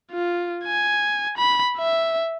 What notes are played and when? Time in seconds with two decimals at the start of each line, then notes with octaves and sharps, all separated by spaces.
0.12 F4
0.64 G#5
1.37 B5
1.78 E5